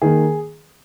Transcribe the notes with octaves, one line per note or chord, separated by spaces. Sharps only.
D#3 A#3 G#4